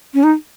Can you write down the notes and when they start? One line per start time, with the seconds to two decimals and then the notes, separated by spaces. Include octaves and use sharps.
0.14 C#4
0.23 D#4